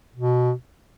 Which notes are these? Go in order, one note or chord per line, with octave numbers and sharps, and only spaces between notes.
B2